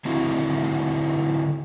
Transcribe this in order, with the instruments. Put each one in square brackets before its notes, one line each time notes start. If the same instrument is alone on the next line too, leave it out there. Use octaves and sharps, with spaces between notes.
[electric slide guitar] D3 C4 D#4 E4 F#4